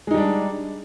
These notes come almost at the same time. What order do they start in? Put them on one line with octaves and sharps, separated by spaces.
G#3 D#4 G3 D4